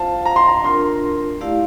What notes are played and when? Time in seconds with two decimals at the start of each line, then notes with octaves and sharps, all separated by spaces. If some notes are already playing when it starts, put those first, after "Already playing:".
Already playing: F4 C5 F5 A5
0.26 A#5
0.36 C6
0.48 A#5
0.63 D4 F4 A#4 C6
1.41 A3 E4 G4 D5 F5